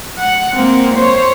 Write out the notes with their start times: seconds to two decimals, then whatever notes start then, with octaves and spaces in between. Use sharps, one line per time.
0.18 F#5
0.56 A#3 C4
0.95 C5 C#5